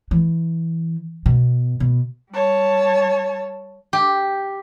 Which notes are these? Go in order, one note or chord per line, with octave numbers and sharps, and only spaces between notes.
E3
B2
B2
G3 C#5 A5
G4